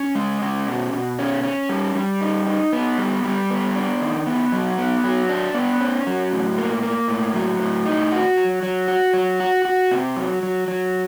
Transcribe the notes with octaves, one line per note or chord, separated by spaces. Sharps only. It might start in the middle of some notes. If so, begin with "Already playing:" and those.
Already playing: C#4
G#3
C#4
B2
B2
C#4
C#4
G3
G3
D#4
D#4
B3
G3
G3
B3
D4
D#3
B3
F#3
B3
F#3
D4
B3
C#4
F#3
A2
A#3
A#3
A2
F#3
A2
D#4
F#4
F#3
F#3
F#4
F#3
F#4
F#4
C3
F#3
F#3
F#3